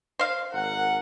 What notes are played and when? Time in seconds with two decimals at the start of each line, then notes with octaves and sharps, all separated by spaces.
0.19 C5 F5
0.53 G#1 A#4 F#5